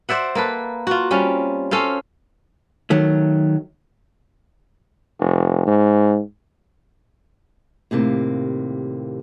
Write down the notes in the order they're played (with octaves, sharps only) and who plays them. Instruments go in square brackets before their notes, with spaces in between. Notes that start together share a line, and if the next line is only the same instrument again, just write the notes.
[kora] C5 D5 E5 F#5
A#3 A4 B4
F4 F#4
G3 C4 C#4 F4
C#4 A4 C5 F5
[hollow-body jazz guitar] D#3 F#3 A3
[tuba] F1
G#2
[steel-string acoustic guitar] D#2 A2 C3 A#3